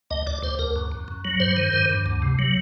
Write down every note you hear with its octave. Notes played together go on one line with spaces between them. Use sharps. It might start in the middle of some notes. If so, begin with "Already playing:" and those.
D2 D#5
D2 D5
D2 C5
D2 A#4
F#2
F#2
F#2
F#3
G2 C5
D#3
G2
G2
D2
C3
F#3